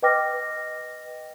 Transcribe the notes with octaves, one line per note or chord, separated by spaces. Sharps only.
B4 D#5 G5 D6 F6 A#6